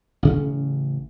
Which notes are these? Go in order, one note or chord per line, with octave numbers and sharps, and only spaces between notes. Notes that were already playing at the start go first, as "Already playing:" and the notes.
A1 C#3 C#4